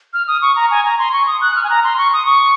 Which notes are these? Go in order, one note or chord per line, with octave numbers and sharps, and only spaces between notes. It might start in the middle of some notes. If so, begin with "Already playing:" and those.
F6
D#6
C#6
A#5
G#5
A#5
C6
C#6
D#6
F#6
F6
G#5
A#5
C6
C#6
D#6
C#6